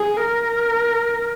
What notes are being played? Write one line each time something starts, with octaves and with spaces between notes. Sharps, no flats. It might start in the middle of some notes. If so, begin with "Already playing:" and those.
Already playing: G#4
A#4